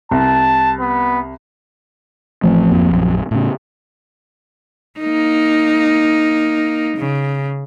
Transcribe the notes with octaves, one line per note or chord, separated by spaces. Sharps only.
C2 A5
B3
A1 E3 F3 A3 C4
G#1 F2 A#3
A#1 F#2
A2 C#3
A#3 D#4
C#3